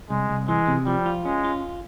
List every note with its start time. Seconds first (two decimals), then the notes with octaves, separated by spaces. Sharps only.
0.10 C2 G#3
0.29 C2
0.48 E3 G#3
0.68 C3
0.86 F3 G3
1.06 F4
1.25 G#3 C#4
1.44 F4